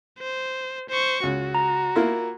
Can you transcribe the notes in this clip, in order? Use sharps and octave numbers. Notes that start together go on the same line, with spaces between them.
C5
C5 C#6
C#2 F#4
A#5
A#3 E4 F4